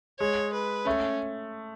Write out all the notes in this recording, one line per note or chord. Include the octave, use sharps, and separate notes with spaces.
G#3 C#5
B4
A3 C#4